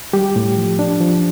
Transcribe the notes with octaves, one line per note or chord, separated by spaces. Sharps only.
G3 G4
A2
F3
D4
F3